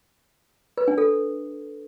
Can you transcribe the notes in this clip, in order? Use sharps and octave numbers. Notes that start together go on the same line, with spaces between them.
B4
D4
A4